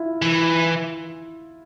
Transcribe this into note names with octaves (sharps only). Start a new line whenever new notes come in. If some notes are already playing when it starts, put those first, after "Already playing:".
Already playing: E4 F4
E3